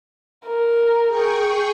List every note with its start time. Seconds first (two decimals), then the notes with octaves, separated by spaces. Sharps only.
0.46 A#4
1.08 G#4 G5 C#6